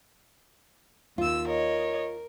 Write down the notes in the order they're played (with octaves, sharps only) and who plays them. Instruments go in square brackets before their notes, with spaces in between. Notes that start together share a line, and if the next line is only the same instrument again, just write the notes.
[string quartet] D#2 E6 [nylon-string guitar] F4
[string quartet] A#4 [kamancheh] C#5 D#5